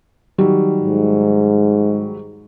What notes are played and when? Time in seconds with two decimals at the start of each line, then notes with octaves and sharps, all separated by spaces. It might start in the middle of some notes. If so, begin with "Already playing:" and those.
0.38 D#3 F#3 G3
0.83 G#2